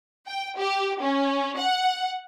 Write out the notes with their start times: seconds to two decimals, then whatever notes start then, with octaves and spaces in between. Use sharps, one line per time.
0.27 G5
0.58 G4
1.03 C#4
1.58 F#5